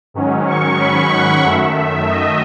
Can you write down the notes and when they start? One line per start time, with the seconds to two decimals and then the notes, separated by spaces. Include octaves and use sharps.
0.14 G#2 D#3 F#3 C#4
0.48 C#6
0.79 B5
1.12 F#5
1.44 F#2 D#3 A3 E5
2.09 D#5